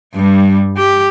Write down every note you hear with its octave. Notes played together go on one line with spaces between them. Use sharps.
G2 G3
G4